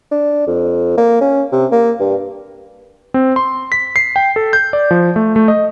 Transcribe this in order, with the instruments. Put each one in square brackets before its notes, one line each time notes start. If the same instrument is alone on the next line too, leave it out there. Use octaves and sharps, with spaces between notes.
[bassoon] D4
F2
A#3
C#4
C3
A#3
G2
[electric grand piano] C4
C6
B6
C7
G5
A4
G6
D5
F3
A3
A3
D#5